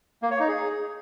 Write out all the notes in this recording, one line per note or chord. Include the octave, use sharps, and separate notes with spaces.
A#3
C#5
D#4
G#4